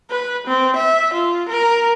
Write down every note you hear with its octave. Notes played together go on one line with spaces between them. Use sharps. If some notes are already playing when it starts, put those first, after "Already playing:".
B4
C4
E5
F4
A#4